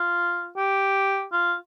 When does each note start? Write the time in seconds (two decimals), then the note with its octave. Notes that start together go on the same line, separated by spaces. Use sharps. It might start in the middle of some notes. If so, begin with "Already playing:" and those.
Already playing: F4
0.57 G4
1.33 F4